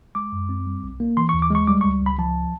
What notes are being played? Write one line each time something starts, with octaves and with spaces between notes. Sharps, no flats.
G#3 D6
F#2
C4
G3
B1
A#3
E3 C6
C#6
D#2
D6
G#3 C#6
G3 D6
C#2 C#6
C#2 B5
F3 A5